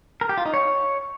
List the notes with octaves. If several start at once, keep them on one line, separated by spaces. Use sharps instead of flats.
A#4
G4
F4
D#4
C#5